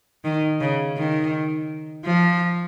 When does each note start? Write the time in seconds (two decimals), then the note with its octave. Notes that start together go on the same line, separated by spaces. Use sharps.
0.24 D#3
0.60 C#3
0.97 D#3
2.05 F3